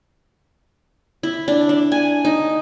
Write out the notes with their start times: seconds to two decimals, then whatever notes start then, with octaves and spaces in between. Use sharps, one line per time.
1.23 E4
1.48 D4
1.69 D4
1.92 G#5
2.25 D#4